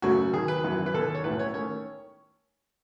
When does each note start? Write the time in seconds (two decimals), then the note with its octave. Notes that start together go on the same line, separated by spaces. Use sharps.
0.02 F#2 C#3 F#3 A3 C#4 F#4
0.33 D#2 D#3 F#3 G#4
0.48 B4
0.63 G#1 F#2 E3
0.86 B4
0.94 D#2 D#3 G#3 B3 A4
1.15 C#5
1.24 B1 A2 E3 A3 C#4 B4
1.39 C#5
1.54 D#3 A3 C#4 C#5